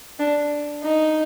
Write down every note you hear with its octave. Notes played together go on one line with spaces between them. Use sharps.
D4
D#4